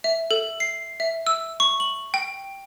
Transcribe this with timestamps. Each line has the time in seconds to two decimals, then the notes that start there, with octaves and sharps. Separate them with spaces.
0.04 E5
0.31 A4
0.60 C7
1.00 E5
1.27 E6
1.60 C#6
1.80 F#7
2.14 G5